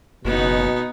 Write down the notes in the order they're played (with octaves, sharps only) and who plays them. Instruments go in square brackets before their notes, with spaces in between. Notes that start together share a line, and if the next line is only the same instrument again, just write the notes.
[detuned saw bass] F#1 [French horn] B2 [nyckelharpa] B3 D#4